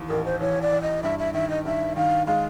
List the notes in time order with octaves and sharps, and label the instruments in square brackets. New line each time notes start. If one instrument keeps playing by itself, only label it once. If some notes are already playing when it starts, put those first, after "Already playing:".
Already playing: [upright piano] D#2 E3
[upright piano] A1 [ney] A#4
[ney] C5
[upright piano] E3 [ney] C#5
[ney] D5
[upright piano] E3
[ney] D#5
[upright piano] G2 [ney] E5
[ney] E5
[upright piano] D#3 [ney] E5
[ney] D#5
[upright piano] G2 [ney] E5
[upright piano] D#3 [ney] F5
[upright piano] G#3 [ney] F5